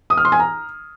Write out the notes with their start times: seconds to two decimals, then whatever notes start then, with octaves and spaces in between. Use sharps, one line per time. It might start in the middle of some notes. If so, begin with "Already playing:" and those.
0.10 D#6
0.17 F6
0.25 C6
0.32 G#5
0.39 A#5